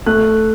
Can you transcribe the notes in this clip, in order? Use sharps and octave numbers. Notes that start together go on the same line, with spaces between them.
A3 F#6